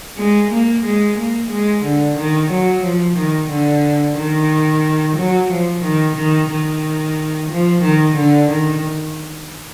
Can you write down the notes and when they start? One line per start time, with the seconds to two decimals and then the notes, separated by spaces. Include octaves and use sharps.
0.17 G#3
0.51 A#3
0.85 G#3
1.18 A#3
1.50 G#3
1.84 D3
2.17 D#3
2.51 F#3
2.83 F3
3.17 D#3
3.50 D3
4.17 D#3
5.17 F#3
5.50 F3
5.83 D#3
6.16 D#3
6.50 D#3
7.50 F3
7.82 D#3
8.16 D3
8.49 D#3